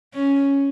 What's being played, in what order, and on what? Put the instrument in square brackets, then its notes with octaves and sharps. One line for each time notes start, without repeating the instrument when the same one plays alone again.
[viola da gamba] C#4